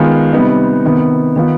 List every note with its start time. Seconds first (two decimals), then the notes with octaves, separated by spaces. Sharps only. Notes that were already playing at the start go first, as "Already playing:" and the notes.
Already playing: D#3 G#3 B3 F4
0.33 C3 G3 B3 D#4
0.84 C3 D#3 B3
1.36 D#3 B3 F4